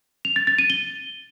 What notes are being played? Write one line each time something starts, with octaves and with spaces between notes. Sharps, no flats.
F7
A6
A6
D#7
G7